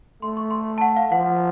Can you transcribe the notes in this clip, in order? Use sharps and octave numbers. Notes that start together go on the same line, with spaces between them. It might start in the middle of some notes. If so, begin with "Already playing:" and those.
A3 C6
C#6
C6
A5
F#5
F5
F3 F#5